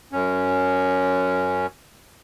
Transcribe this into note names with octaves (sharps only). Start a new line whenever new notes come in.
F#2 C#4